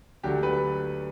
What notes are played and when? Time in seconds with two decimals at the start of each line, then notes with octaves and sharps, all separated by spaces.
0.24 D2 D3 F#3 G4
0.43 B4